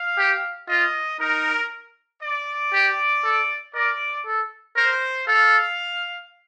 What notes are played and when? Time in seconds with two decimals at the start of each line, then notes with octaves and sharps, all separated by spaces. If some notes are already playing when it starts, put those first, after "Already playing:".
Already playing: F5
0.18 G4
0.69 F4 D#5
1.20 D#4 A#4
2.22 D5
2.73 G4
3.24 A4
3.75 A#4 D5
4.26 A4
4.76 A#4 C5
5.27 A4 F5